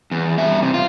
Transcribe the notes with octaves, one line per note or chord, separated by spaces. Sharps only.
E2
G2 E5
C3
F4